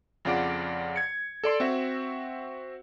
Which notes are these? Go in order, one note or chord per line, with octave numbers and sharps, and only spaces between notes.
F2 C#3 F4 D5 F#5 D6
G#6 C#7
A4 D5 C6
C4 F#4 E5